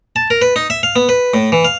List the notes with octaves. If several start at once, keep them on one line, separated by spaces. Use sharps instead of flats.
A5
A#4
B4
D#4
E5
F5
B3
B4
A2
E3
F5